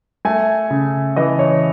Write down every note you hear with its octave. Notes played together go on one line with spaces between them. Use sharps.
A3 G#5
C#3
E3 D#5
C#5